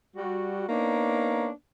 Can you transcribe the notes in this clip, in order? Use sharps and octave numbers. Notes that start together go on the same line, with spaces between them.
G3 F#4
A#3 B3 D4 D#4 C#5